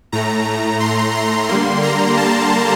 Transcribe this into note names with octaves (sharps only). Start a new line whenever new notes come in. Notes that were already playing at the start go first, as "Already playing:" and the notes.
A2 A3 A#5
C6
C6
D3 G3 A#3 C6
A#5
A5